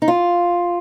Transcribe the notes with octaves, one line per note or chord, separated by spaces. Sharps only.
D#4
F4